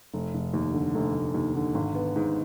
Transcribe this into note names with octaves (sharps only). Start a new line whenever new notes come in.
F1
F1
D#2
D3
F1
F1
D#2
D3
G#1
B3
G#2